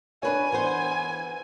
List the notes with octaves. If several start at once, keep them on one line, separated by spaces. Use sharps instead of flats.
D4 B4 C#5 G#5
E3 B3 C5